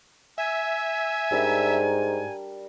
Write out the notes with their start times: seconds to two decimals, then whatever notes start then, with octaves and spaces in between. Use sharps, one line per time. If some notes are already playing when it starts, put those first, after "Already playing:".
0.38 E5 G#5
1.31 G#2 G3 D4 A#4